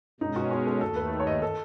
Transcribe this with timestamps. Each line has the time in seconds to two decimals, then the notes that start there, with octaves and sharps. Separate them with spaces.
0.20 B2 G#3 C#4 D#4
0.36 F#4
0.51 F#4
0.66 A4
0.81 D#2 D#3 A3 A4
0.96 B4
1.20 C#5
1.27 D#5
1.42 A4